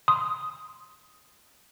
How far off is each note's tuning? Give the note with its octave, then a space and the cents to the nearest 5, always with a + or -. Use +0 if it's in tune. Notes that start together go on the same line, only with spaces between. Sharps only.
C6 +0 D#6 +0